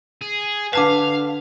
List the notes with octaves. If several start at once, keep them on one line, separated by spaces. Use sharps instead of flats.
G#4
D3 B4 F5 A5 D6 B6